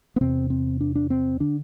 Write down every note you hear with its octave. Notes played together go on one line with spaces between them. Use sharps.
B3
E2 C3 C4
C4
D4
D4
C4
D3 D4